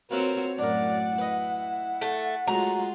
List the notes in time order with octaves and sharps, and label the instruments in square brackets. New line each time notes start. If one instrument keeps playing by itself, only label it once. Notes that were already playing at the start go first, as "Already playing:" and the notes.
[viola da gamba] C4 F#4 C#5 [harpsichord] F4 B4 E5 [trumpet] A#4
[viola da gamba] F#2 A2 D5 [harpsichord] D4 A#4 [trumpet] F#5
[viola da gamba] E4 [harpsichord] B4 D#5
[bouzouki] A3
[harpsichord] F#3 A3 [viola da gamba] G#3 F4 [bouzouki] A#5